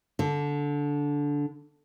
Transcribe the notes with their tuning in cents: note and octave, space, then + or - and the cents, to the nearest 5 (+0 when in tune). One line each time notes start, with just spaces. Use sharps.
D3 -15